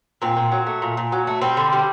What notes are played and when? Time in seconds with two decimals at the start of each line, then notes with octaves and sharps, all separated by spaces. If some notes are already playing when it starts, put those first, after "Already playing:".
0.22 A#2 C4
0.37 A#2
0.52 F#3
0.67 A3
0.82 A#2
0.97 A#2
1.12 F#3
1.27 A3
1.42 G3 C4
1.57 D3
1.73 G3